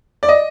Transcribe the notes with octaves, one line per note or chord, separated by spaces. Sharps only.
D5
D#5